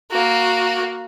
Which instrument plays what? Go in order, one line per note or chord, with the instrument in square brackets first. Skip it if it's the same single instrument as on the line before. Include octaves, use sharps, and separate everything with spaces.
[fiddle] A#3 F#4